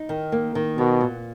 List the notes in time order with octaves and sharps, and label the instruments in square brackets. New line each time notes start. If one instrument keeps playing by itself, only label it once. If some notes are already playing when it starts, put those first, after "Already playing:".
Already playing: [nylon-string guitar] D#4
D#3
A#3
D#3
[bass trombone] B2 [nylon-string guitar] B3
[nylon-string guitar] A#2